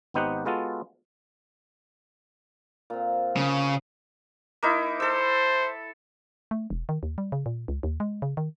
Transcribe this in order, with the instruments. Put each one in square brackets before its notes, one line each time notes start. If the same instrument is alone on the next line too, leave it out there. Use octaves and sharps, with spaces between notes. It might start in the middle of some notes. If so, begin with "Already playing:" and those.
[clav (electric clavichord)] G#1 B3 D#4 G4 C5 F#5
G#3 B3 F4 F#4 A4
[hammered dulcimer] A#2 C4
[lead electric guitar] C#3
[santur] A#3 D#4 E4
[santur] A4 E6 [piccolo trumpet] C5
[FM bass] A3
E1
D#3
D#2
G3
C#3
A#2
C#2
D#2
G#3
C#3
D#3